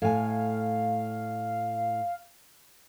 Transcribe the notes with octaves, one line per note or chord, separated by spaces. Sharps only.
A2 F5 G#5